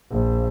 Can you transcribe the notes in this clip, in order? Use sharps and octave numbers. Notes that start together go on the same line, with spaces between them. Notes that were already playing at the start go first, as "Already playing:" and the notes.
A#1